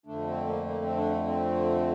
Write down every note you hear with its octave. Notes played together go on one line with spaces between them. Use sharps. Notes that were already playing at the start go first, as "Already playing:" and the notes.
F2 D3 A3 D4
C4
A#3
A#3
C4
D4
C4